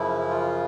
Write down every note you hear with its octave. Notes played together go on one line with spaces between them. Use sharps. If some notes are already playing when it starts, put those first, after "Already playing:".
Already playing: F#2 C#3 F3 E4
F4